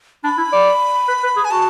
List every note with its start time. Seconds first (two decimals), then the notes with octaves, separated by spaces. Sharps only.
0.24 D4 B5
0.38 E4
0.53 D5
1.08 B4
1.23 B4
1.36 G#4
1.45 G#5
1.51 F#4 A5